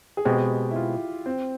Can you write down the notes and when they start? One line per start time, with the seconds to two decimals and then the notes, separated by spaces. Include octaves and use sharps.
0.17 G#4
0.25 B2 G#3 C4 G4
0.71 E4
0.76 F4
1.26 C4